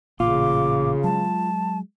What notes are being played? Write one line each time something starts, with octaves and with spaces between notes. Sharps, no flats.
A1 A#2 C#3 F4 D6
F#3 G#3 A5